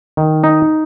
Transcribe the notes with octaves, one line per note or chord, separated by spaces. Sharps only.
D#3
D#4